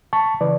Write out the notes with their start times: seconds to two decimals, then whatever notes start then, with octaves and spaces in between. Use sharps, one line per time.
0.13 A5 C#6
0.41 C#3 E3 B4 D5